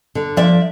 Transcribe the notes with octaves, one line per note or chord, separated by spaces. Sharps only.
D3
F3 D5 E5